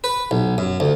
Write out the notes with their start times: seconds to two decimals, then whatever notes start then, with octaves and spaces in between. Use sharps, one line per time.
0.04 B4
0.31 B1
0.58 F#2
0.80 D2